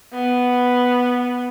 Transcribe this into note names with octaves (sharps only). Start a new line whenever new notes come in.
B3